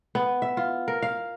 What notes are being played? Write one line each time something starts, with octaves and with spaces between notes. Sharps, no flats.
B3
E5
F4
A#4
F5